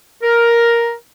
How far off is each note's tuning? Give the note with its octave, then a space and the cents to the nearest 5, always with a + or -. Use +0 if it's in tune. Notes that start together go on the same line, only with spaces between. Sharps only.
A#4 +5